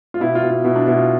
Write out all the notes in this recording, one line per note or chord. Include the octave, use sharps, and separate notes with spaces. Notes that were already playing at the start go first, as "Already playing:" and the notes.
F4
B2 E4
F4
B2
F4
B2 E4
D4
B2 E4
F4